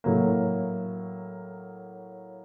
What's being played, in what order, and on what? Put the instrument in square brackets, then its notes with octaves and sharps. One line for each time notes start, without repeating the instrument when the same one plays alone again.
[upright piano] A2 F#3 A#3